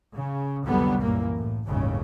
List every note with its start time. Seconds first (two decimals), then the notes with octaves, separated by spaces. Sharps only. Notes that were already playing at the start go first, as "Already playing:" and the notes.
0.15 C#3
0.66 C2 F2 D3 F#3 G3 B3
1.01 F#2 A#2 E3 A#3
1.36 A2
1.68 G1 D#2 A2 C#3